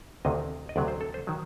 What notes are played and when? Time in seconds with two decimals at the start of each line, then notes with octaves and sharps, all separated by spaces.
0.25 D2 C3 D#3 D#5
0.69 D#5
0.76 D2 C3 F#3 D5
0.88 C5
1.01 A4
1.14 C5
1.27 D#3 F#3